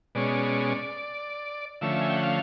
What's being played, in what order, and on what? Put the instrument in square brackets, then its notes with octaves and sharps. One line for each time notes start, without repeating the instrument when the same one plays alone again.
[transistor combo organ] B2 G#3 C#4 D5
D3 F3 A3 C#4 E5
G#5
G5
F#5
F5